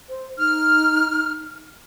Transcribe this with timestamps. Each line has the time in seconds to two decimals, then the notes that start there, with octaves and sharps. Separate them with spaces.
0.10 C5
0.38 D#4 F6